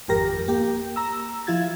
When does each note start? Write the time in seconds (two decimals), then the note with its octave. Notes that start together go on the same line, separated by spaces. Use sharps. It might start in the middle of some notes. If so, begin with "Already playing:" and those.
0.08 G#1 F2 G4 A#4 A#6
0.48 A#3 G4
0.96 A#5 E6
1.47 F3 E4 F4 G#6 A6